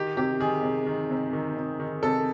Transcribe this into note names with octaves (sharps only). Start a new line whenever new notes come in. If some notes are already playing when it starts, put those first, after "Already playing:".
Already playing: D#3 G4
C3 G4
D#3 G#4
C3
D#3
C3
D#3
C3
D#3
C3 A4